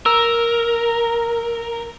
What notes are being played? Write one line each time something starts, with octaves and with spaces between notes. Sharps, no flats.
A#4 E6